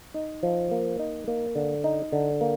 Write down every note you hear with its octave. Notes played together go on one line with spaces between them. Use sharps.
D#4
F3
A#3
D#4
A#3
D3
D#4
D3
A#3